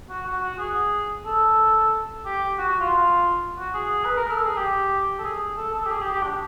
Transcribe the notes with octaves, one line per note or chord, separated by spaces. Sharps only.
F#4
F#4
F#4
G#4
A4
G4
F#4
F#4
F4
F#4
G#4
B4
A#4
A4
G#4
G4
A4
G#4
A4
A4
G4
G#4
G4
G4
D4